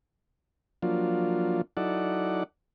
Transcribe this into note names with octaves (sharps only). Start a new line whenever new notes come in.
F3 F#3 A#3 D4 F4
F#3 D#4 E4 A4 D5 F#5